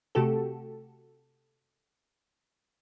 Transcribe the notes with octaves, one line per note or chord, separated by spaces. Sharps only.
C3 A3 F#4 G4 A4